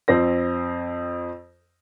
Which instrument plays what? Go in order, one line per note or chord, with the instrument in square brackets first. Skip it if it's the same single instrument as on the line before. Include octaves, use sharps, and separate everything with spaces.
[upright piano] F2 C4 C5 A#6